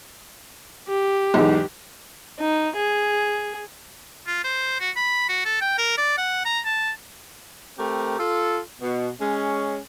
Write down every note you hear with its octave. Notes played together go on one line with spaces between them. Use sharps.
G4
B1 E2 G#2
D#4
G#4
F4
C5
F#4
B5
F#4
A4
G5
A#4
D5
F#5
A#5
A5
A3 C4 G4 A#4
F4 A4
B2
G#3 C#4